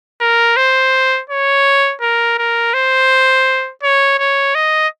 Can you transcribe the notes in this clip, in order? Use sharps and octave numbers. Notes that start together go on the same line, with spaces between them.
A#4
C5
C#5
A#4
A#4
C5
C#5
C#5
D#5